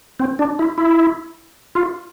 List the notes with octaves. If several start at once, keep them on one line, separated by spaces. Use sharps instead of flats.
C4
D4
E4
E4
F4